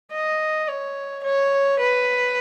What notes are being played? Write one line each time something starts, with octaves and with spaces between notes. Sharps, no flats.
D#5
C#5
C#5
B4